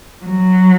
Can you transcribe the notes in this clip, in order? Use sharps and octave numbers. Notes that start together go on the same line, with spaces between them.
F#3